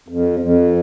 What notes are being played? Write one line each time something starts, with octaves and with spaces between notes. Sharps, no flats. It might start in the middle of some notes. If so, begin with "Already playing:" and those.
F2
F2